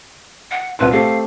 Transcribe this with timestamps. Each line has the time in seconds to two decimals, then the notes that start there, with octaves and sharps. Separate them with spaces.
0.51 F#5
0.79 C2 C3 B4 C6
0.92 A3 C4 G4 F5